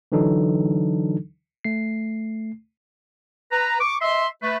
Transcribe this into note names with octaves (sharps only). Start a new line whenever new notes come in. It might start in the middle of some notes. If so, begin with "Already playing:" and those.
D3 E3 F#3 D4 D#4 A4
A3 C7
B4 A#5
C#6 D6
D#5 E5 C6
A3 B4